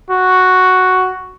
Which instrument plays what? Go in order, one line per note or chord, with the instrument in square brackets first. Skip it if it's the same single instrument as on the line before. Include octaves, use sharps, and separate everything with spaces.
[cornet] F#4